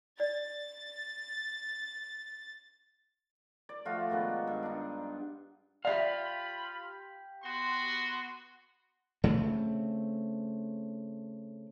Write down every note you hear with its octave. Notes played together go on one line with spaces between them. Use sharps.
D5 A6
D5
F3 A3 F4 F#4
G#2 D#3 B3 D4
G2
D4 D#4
F4 G4 D5 E5 F5 B5
B3 F#4 C6
C#3 A3 C4